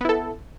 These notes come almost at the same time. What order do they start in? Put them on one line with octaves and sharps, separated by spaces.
B3 E4 A4